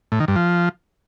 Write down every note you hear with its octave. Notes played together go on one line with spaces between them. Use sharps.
A2
D#3
G2
F3